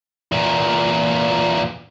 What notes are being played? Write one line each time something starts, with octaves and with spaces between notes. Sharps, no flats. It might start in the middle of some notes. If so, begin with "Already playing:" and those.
E2 A#2